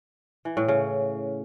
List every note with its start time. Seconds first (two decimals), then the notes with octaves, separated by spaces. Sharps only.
0.45 E3
0.57 A2
0.68 C#3